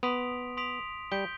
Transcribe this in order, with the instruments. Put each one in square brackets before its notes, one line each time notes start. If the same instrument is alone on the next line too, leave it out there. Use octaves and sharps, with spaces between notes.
[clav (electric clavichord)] B3 [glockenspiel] C6 D#6 B6 D7 F7
[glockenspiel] C6 D#6 B6 D7 F7
[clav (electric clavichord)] G3 [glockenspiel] G6 B6 D7 G7